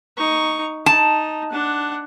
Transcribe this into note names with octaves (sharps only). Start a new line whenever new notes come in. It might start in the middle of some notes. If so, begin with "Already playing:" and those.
D#4 C#6
D#4 A5
D4 F#5